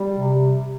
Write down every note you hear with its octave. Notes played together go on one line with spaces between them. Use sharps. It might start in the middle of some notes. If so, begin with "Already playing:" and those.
Already playing: G3
C3